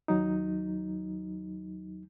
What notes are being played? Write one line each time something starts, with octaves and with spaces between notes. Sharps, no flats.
D#2 F#3 D#4